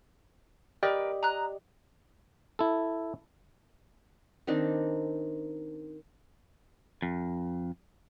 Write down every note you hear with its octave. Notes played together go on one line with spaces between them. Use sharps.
G4 A#4 B4 D5 D#5
A#5 D#6 F#6
E4 A4
D#3 C4 D4 D#4
F2